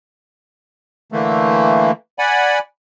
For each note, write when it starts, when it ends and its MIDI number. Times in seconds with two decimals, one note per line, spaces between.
1.12 1.91 50
1.12 1.91 52
1.12 1.91 57
1.12 1.91 58
2.19 2.59 74
2.19 2.59 78
2.19 2.59 80
2.19 2.59 83